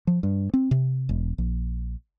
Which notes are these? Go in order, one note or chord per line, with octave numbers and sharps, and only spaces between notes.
F3
G2
C4
C3
E1
A#1